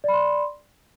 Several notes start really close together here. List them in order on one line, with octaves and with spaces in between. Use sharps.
D5 B5 C6